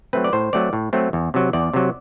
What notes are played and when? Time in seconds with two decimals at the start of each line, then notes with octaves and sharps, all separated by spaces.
0.13 F#3 A3 C4 B4
0.24 D5
0.33 A2 C5
0.53 F#3 A3 C4 D5
0.73 A2
0.93 F#3 A3 C4
1.13 E2
1.34 C3 F#3
1.53 E2 D5
1.74 C3 F#3